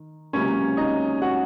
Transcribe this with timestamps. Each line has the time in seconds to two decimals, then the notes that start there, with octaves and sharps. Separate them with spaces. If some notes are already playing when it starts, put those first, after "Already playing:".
Already playing: D#3
0.33 C#2 C3 F#3 A#3 C#4 C#5
0.77 D#4 D#5
1.22 F#4 F#5